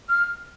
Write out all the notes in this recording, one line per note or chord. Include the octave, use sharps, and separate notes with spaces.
F6